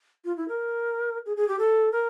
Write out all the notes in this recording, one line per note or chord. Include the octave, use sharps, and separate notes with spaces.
F4
E4
A#4
G#4
G#4
G4
A4
A#4